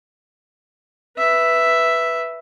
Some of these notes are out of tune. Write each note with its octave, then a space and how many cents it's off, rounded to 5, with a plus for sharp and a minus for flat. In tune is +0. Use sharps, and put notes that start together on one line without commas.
B4 +0 E5 +0